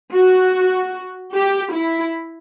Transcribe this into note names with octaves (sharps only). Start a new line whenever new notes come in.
F#4
G4
E4